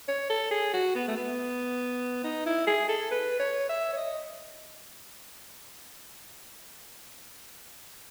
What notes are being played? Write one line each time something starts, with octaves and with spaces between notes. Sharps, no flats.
C#5
A4
G#4
F#4
B3
A3
B3
D#4
E4
G#4
A4
B4
C#5
E5
C#5
D#5